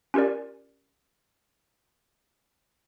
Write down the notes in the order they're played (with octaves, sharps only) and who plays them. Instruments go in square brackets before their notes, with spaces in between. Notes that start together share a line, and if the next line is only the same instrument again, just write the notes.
[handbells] C#4 F4 G4 A#4 D5